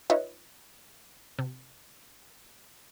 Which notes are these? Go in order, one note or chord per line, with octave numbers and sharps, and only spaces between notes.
D#4 F4 B4 C#5 D#5 E5
C3